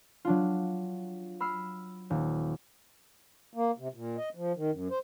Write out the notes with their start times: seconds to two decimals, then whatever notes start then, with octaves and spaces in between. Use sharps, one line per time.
0.25 F#3 D4 F4
1.40 B5 E6 F6 C7
2.10 D#1
3.54 A#3
3.78 C3
3.94 A#2
4.17 D#5
4.35 F3
4.56 D#3
4.72 F#2
4.91 C5